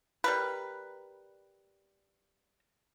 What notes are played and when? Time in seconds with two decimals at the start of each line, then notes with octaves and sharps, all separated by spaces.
0.24 G3 A#4 B4